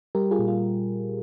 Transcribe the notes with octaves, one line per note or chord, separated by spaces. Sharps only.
G3 G4 A#4
F4 G#4
A#2
F4